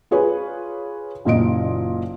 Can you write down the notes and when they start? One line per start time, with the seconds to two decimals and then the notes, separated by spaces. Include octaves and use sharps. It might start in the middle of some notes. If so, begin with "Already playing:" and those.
0.11 F4 G#4 B4 C#5
1.25 F#1 A#2 D#5 D7